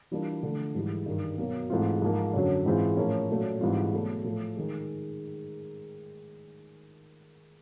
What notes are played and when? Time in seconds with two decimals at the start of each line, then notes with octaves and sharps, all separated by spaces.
0.11 E3 G3 A#3 D4 F4
0.43 D3 F3 A3
0.75 G#2 E3 G3
1.06 G2 D#3 G3
1.38 B2 F#3 A#3
1.70 G#2 E3 A3 C4 F4
2.02 G#2 F3 A#3
2.33 F#2 D3 F#3
2.66 G#2 E3 G#3 C4 F4
2.97 A2 F3 A#3 C#4
3.29 A#2 F#3 A3 C#4
3.61 G#2 E3 G3 C4 F4
3.93 B2 F#3 A3
4.24 A2 F3 A3
4.57 D#3 G#3